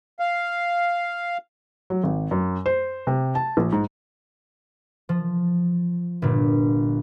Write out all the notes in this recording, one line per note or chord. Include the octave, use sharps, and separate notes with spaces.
F5
F#3
G#1
F#2
C5
C3
A5
A#1
G#2
F3
G1 A#2